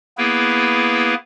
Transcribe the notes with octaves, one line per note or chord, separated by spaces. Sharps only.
A#3 B3 E4 G#4 B4